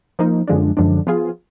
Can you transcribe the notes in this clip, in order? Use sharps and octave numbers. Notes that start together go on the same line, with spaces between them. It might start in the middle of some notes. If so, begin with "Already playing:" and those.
F3 A#3 D#4
F#2 D3 F3 G#3 D4
F#2 D3 F3 G#3 D4
F3 B3 F4 G#4